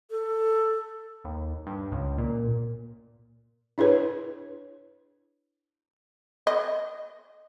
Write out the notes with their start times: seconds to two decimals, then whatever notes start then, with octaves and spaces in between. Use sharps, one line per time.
0.10 A4
1.24 D#2
1.67 G2
1.92 C#2
2.18 A#2
3.78 D4 E4 G#4 B4 C#5
6.47 D#5